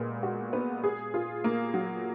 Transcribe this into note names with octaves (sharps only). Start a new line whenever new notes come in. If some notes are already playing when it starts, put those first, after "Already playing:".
Already playing: A#2 G#3 B3
F#4
B3
G#4
F4
A#3
F#3